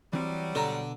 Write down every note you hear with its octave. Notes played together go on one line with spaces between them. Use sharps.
E3 F#3 G3 C4
B2 D3 A#5